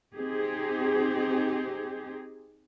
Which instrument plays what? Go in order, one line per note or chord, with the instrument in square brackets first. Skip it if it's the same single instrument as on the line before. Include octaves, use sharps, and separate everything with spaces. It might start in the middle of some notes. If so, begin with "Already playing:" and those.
[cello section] C4 D#4 G4 G#4